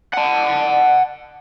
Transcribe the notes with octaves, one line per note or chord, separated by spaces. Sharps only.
F#5 A5